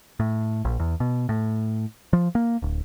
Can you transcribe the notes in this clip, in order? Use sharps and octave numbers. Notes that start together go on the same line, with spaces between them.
A2
A#1
E2
B2
A2
F3
A#3
D1